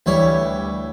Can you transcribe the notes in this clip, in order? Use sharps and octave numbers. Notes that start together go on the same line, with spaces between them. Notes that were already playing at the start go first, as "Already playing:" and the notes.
D2 E3 G3 E4 C#5